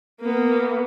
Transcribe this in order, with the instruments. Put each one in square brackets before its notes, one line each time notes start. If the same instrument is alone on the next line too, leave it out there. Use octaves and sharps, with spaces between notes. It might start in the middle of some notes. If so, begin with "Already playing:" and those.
[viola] A#3 B3